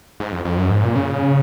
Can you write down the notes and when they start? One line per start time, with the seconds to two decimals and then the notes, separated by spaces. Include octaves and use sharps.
0.20 G#2
0.32 F2
0.45 F2
0.57 F#2
0.70 G#2
0.83 A#2
0.96 C#3